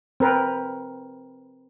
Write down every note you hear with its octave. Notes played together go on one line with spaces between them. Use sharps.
C4 A#4 B4